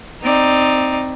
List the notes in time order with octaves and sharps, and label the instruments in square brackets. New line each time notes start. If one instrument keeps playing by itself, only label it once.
[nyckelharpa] C4 [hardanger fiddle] D#4 D5